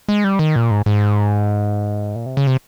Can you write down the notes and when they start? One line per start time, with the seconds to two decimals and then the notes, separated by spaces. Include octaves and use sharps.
0.08 G#3
0.24 G3
0.39 D#3
0.56 A#2
0.71 G#2
0.86 G#2
2.15 A#2
2.26 C3
2.37 C#3
2.47 C3